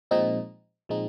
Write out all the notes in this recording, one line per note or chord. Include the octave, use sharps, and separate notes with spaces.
A#2 F3 G#3 C4 D#4
A#2 F3 G#3 C4 D#4